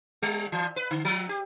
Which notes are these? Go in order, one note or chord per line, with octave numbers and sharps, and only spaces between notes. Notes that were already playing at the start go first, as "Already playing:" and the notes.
G3
E3
B4
D3
F3
G4